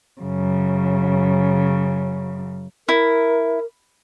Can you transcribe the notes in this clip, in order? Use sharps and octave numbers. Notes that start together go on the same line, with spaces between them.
F#2 C#3
E4 A#4